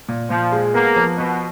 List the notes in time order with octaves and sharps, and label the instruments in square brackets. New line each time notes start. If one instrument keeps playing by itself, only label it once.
[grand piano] A#2
[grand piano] A#2 [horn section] F3
[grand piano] G#3
[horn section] A#3 [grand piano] B3
[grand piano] F3
[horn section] B2 [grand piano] B3